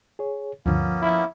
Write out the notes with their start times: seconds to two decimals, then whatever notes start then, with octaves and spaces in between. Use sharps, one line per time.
0.19 G#4 C#5
0.66 D2 G2 D3 F3 A#3 B3 C#4
1.02 E4